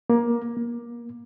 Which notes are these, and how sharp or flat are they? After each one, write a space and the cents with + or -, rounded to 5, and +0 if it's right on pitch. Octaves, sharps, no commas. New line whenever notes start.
A#3 +20
A#3 +25